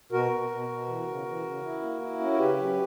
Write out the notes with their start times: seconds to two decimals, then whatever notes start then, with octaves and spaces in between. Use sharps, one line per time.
0.12 B2 F#4 A#4
0.31 B2
0.50 B2
0.69 B2
0.88 E3
1.06 C#3
1.25 E3
1.44 C#3
1.63 E4
1.82 A#3
2.01 E4
2.20 C#4
2.33 A#4
2.38 C#3 G4 B4
2.58 F#3